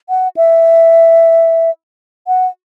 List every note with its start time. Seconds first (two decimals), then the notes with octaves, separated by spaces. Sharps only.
0.09 F#5
0.37 E5
2.27 F#5